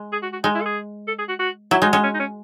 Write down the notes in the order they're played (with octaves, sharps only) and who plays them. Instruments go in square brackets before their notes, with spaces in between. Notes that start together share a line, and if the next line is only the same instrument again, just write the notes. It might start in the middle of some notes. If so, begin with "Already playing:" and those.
Already playing: [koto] G#3
[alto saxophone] G#4
F#4
F#4
[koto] G#3 [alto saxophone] D#4
[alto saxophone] E4
A4
G#4
A4
G#4
F#4
F#4
[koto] F#3 [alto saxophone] E4
[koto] G#3 [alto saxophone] D#4
[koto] G#3 [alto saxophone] C#4
[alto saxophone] C#4
D#4
C#4